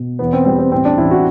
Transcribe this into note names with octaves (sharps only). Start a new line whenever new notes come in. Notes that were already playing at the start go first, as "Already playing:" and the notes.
Already playing: B2
E2 B3
C4
G3 C4
C4
A2 C4
D4
A1 E4
F#4